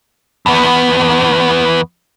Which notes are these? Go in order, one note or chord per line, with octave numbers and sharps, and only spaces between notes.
E2 B3